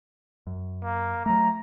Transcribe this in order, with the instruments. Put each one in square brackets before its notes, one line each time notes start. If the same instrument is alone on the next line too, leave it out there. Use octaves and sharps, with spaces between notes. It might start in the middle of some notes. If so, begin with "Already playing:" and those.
[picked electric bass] F#2
[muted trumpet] A#3
[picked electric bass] F#3 A3 [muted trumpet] A#5